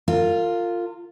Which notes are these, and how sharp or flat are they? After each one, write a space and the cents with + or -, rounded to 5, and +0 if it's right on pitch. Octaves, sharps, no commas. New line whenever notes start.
F4 +0 A#4 -40